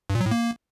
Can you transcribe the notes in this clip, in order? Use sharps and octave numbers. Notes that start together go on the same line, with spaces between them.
G2
A#2
F#3
A2
A#3